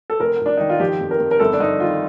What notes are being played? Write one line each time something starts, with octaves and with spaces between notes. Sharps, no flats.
A4
F1 A#4
F1 D4
D#3 D#4
F4
F3 G4
F2
A#4
F2
A#4
G1 A4
D4
G1 D#4
D#3 F4